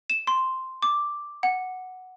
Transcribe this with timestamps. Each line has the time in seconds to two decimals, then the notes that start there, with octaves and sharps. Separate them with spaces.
0.10 E7
0.27 C6
0.82 D6
1.43 F#5